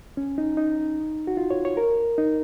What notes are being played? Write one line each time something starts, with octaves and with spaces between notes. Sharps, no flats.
C#4
D#4
D#4
F#4
F4
C#5
C#5
A#4
D#4